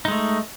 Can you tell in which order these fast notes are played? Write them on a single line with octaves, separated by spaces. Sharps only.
D#4 G#3 A3